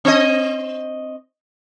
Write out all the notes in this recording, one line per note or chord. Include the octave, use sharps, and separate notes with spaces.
C4 D#5